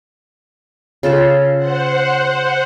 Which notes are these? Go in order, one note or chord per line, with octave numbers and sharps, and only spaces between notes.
C#3 F4 A4
C5 F#5